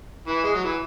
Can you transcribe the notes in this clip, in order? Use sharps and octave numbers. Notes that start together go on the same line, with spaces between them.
E3
G#3
F#3
E3